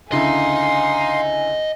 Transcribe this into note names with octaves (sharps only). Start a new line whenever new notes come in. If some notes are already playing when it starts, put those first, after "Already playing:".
C#2 D3 E4 D#5 F5 G#5 A#5 C6